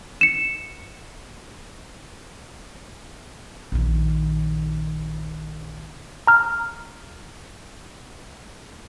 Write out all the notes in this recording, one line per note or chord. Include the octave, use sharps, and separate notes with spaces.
C#7 E7
A#1 D#3
A#5 F6